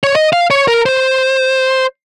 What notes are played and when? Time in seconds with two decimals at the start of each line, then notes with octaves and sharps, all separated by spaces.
0.04 C#5
0.15 D#5
0.33 F5
0.51 C#5
0.68 A#4
0.86 C5